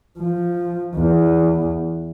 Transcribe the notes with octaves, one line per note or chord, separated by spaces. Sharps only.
F3
E2